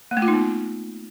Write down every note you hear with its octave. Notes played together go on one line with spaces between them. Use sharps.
A#3
A3
F4
D#4
B3